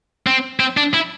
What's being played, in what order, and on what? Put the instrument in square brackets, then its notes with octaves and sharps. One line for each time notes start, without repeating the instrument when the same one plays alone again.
[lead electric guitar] C4
C4
D4
E4